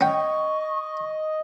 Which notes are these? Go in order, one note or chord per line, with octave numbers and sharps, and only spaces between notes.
C#4 D#5 G5 C#6